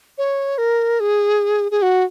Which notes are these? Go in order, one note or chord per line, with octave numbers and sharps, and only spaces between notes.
C#5
A#4
G#4
G#4
F#4